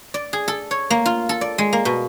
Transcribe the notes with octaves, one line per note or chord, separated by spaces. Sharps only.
D5
G#4
A4
C#5
A#3
F4
A4
D5
G#3
A#3
B2